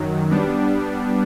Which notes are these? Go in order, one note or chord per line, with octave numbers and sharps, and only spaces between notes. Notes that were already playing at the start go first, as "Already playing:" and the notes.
Already playing: F#2 D#3 F#3
G3 B3 D4